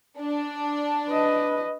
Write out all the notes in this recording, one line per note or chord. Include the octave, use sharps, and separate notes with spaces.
D4
B4 D#5